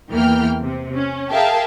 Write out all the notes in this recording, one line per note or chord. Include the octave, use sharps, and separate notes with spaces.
E2 E3 A#3 G5 F6
C3
C#4
G#4 A#4 E5 F5 G5 A5